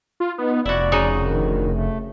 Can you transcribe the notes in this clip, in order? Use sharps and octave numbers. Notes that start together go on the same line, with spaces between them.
F4
B3 D#4
F1 E4 F#4 D5
C#3 D#4 F#4
D2 D#3
A3